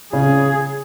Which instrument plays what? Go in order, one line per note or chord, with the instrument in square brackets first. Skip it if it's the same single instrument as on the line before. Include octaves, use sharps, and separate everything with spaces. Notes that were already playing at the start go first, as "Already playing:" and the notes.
[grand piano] C#3 [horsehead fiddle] G#4